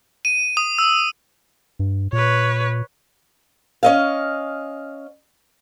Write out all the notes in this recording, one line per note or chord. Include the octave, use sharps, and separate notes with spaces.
D#7
D#6
E6
G2
A#2 B4 C#5
C#4 D#5 F5